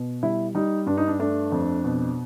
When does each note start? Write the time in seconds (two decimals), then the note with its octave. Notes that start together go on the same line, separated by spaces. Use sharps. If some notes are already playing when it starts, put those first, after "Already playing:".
Already playing: B2
0.23 G3 E4
0.55 G3 D#4
0.86 G2 D4
0.97 D#4
1.08 D4
1.19 A3 D4
1.52 F2
1.84 B2